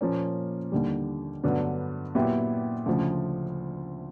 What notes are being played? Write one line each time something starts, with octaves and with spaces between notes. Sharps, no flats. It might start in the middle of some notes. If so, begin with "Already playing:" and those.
A#2 F3 A#3 C#4
D#2 D3 G3
G2 D3 F#3 B3 D4
A#2 F#3 B3 E4 G4
D2 C#3 F3